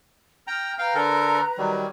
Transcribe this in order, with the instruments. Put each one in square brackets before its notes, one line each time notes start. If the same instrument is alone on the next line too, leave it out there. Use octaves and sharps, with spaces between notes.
[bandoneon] G5 A#5 [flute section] F6
[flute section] B4 A#5 [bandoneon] F5 G5
[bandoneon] D3 A4 A#4
D#3 F#3 G3